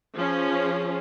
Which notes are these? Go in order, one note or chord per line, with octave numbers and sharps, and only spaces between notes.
F3 C#4 G#4